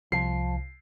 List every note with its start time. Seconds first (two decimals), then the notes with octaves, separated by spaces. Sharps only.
0.12 C2 F3 C7